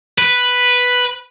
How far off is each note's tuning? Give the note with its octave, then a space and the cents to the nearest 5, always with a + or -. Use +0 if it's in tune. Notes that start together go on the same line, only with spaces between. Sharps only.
B4 +0